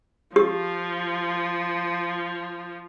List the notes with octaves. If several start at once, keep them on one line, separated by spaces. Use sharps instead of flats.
F3 G4